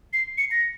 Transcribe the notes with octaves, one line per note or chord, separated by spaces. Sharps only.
C7
C#7
A#6